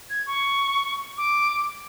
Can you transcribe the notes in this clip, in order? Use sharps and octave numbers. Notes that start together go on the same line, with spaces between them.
G#6
C#6
D6